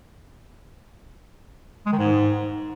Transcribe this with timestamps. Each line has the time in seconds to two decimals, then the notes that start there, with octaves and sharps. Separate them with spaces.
1.86 G#3
1.92 D#3
1.99 G#2